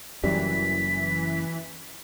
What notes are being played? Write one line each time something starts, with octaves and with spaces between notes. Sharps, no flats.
F#1 F#2 E3 G3 B6